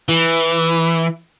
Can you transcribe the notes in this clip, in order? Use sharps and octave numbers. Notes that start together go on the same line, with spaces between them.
E3